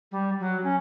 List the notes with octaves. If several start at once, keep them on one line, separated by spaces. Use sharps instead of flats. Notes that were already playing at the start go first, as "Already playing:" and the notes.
G3
F#3
C#4